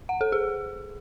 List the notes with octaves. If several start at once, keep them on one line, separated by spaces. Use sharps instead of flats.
F#5
A4
G#4